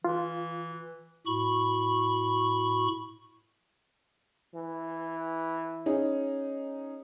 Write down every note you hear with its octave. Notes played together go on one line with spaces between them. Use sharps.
E3 F4
A2 F#4 B5 C#6
E3
C#4 D#4 G#4